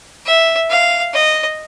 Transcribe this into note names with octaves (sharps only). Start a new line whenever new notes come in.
E5
F5
D#5